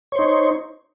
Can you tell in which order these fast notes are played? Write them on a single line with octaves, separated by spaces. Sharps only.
C#5 C5 D#4